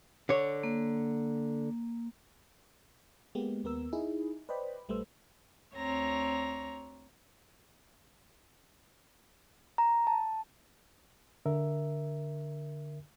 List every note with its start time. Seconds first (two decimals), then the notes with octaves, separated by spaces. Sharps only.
0.29 D3 C#5
0.63 A#3
3.35 G#3 A#3 B3 G4
3.64 D#2 B3 A#4 E6
3.93 D#4 E4 G#4
4.49 B4 C5 D5 D#5 G5 B5
4.88 A#1 G3 A3 B4 C5 E6
5.75 D2 C4 C#5 A#5 A#6
9.78 A#5
10.07 A5
11.46 D3 A#4 E5